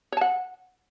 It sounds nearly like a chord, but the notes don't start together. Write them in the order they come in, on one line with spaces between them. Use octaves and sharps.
C#5 A5 F#5